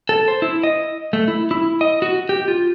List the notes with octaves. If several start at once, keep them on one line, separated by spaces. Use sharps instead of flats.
A4
C5
E4
D#5
A3
E4
E4
D#5
F#4
G4
F4